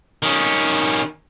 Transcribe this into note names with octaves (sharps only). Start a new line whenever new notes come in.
D#3 C#4